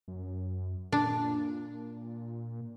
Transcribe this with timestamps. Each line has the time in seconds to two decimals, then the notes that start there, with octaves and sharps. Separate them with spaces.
0.08 F#2
0.92 A#2 D4